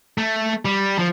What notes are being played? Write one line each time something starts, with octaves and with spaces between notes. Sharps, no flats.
A3
G3
F3